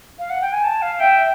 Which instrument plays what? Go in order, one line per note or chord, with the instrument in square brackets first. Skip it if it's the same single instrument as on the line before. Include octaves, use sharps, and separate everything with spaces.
[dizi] F5
F#5
G5
G#5
A5
F5
[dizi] E5 [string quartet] G5